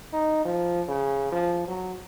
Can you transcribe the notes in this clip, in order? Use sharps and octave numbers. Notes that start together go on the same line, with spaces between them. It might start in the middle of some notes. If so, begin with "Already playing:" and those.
D#4
F3
C#3
F3
F#3